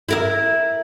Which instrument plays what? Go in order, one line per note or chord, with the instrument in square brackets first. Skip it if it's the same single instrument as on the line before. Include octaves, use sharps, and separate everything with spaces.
[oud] E4 A#4 E5